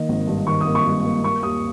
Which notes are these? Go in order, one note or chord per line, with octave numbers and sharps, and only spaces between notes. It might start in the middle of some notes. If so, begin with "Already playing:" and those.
Already playing: D#3 A#3 D#5
G#1
G2
D#3 C#6
D#6
A#3
C#6
G2
A#3
A#3 C#6
D#2 D#6